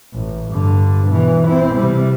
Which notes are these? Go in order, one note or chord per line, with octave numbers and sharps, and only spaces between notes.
A1
G2 D3
B2 E3
C4 E4
C3 G3